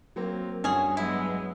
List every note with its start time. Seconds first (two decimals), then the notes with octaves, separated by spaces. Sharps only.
0.16 F#3 A#3 C4
0.64 G2 C#4 F#4 G#4
0.97 F#3 G#3 B3 E4